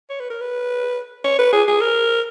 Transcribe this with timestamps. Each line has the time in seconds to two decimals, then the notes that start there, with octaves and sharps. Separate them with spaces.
0.10 C#5
0.20 B4
0.30 A#4
0.41 B4
1.24 C#5
1.39 B4
1.53 G#4
1.68 G#4
1.81 A#4